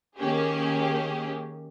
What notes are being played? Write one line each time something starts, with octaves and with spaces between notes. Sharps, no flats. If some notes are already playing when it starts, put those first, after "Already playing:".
D#3 A#3 C#4 G4 G#4